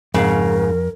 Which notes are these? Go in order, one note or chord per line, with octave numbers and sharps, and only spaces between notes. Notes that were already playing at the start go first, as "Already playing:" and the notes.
F2 G#2 C#3 A#4 F5 F#5